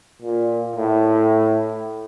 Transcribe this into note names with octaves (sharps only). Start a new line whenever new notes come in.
A#2
A2